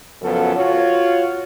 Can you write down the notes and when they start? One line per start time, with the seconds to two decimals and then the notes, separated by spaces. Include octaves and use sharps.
0.21 F#2 C#3 F3 B3 A4
0.56 F4 F#4 C#5